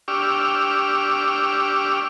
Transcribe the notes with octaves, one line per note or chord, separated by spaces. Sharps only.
D4 G4 C#6 D6 E6 F6